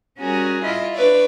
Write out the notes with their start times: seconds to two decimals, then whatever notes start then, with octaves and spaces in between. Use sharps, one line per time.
0.18 G3 C#4 F#4 G#4 A#4
0.64 E4 F4 D#5
0.95 D4 B4 C#5 D5